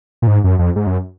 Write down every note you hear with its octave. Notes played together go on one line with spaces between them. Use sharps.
A#2
G#2
F#2
F2
G#2
F#2